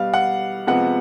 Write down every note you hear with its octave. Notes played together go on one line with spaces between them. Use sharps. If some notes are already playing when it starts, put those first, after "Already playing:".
Already playing: B2 G3 B3 F5
F#5
C3 F3 G#3 B3 F#5